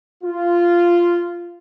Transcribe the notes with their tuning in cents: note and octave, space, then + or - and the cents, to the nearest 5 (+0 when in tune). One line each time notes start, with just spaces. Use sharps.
F4 -10